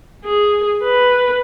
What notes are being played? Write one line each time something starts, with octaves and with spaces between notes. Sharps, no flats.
G#4
B4